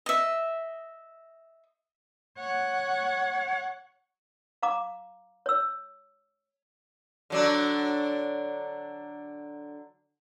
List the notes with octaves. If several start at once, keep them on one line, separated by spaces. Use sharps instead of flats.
D#5 E5
C#5 F#5
F5 A#5 D6
C#5 E6
D3 F#3 D4